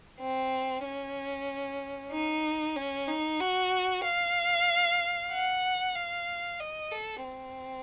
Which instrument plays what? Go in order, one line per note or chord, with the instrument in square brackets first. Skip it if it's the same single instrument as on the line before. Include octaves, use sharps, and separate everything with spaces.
[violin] C4
C#4
D#4
C#4
D#4
F#4
F5
F#5
F5
D#5
A4
C4